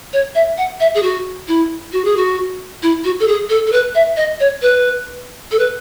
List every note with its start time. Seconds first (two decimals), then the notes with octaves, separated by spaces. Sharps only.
0.13 C#5
0.35 E5
0.58 F#5
0.80 E5
0.95 G#4
1.03 F#4
1.48 E4
1.93 F#4
2.05 G#4
2.17 F#4
2.82 E4
3.04 F#4
3.20 A4
3.28 G#4
3.49 A4
3.67 A4
3.72 B4
3.95 E5
4.17 D#5
4.40 C#5
4.62 B4
5.51 A4
5.59 B4